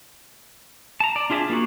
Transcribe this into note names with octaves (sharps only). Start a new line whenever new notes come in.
A5 A#5
D5
D4 F4 G#4 E5 A5
A#3 D4 F#4